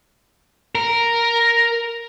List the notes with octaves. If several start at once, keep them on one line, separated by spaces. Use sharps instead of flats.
A#4